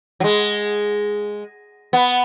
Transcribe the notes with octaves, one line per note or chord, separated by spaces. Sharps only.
F#3
G#3
B3